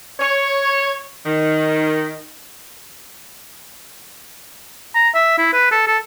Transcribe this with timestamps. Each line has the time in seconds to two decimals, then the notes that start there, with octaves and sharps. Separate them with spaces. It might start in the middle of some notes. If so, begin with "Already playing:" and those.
0.20 C#5
1.26 D#3
4.95 A#5
5.15 E5
5.38 E4
5.53 B4
5.71 A4
5.87 A4